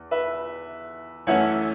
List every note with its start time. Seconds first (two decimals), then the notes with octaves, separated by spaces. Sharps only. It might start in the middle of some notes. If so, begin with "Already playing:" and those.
Already playing: E2
0.11 B4 E5
1.27 F#2 E3 A3 C#4 C#5 F#5